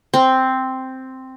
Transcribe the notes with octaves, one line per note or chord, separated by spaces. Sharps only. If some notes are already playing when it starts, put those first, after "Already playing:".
C4